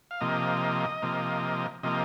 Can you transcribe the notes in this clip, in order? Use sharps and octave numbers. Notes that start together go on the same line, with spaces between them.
F5
C3 F3 A#3 D#5
C3 F3 A#3
C3 F3 A#3 D#5